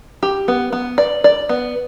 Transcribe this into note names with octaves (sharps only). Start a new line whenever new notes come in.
G4
B3
B3
D5
D5
B3